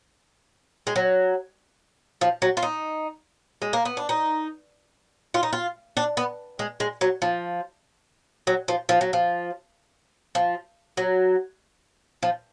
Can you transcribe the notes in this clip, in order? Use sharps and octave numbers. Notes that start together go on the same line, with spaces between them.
G#3
F#3
F3
F#3
F4
D#4
G#3
A#3
B3
D4
D#4
F4
D#4
F4
D4
B3
G#3
G#3
F#3
F3
F#3
F3
F3
F#3
F3
F3
F#3
F3